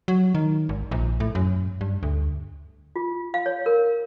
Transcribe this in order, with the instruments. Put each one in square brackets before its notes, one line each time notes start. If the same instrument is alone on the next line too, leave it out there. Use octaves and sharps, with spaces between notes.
[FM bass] F#3
D#3
G#1
A#1
A2
F#2
G2
D2
[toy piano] F4
F5
C#5
A#4